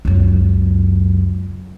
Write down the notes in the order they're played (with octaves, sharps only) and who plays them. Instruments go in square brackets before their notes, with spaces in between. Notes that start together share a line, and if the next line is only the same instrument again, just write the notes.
[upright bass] C#2 F#2